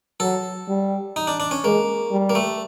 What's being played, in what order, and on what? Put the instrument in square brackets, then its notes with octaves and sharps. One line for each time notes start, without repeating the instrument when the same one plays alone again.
[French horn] F#3 [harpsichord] A4
[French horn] G3
[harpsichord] D#4
D4
D4
C#4
[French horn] G#3 [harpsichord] A#3
[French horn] G3
[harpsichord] A#3
A3